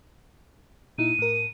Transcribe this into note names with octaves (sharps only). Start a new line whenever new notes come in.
A#2 D#4 E4 D#7
A2 A#4